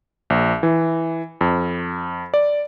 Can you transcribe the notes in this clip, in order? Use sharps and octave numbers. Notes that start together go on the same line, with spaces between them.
A#1
E3
F2
D5